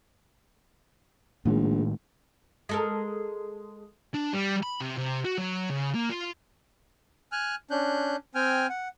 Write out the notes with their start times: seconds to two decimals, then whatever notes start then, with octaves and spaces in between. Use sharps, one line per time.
1.45 A#1 A2 D#3 G#3
2.69 G#3 A4 A#4
4.14 D4
4.34 G3
4.63 B5
4.81 C3
4.98 C3
5.25 F#4
5.38 F#3
5.70 C#3
5.95 A#3
6.09 F4
7.32 G#5 F6 F#6
7.71 C#4 D4 F#6 G6
8.35 C4 G5 G#5 F6
8.69 F#5